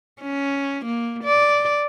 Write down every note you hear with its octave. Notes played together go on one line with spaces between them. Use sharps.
C#4
A#3
D5